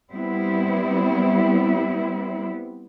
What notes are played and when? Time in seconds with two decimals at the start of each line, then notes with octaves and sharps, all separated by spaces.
0.12 G3 B3 C4 E4